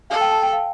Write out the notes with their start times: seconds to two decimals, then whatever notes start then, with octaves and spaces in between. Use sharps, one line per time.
0.10 A4 F5
0.21 G5
0.32 A5
0.43 G5
0.53 F5